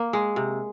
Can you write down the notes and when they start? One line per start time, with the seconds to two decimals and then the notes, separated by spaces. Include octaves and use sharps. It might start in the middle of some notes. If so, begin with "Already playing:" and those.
Already playing: A#3
0.13 G#3
0.36 C3